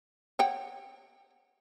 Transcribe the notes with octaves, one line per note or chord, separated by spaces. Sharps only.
C#5 F#5 G5